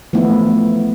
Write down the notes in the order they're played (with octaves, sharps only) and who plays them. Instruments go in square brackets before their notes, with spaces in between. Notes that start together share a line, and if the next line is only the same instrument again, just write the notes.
[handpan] E3 F3 A3 B3 E4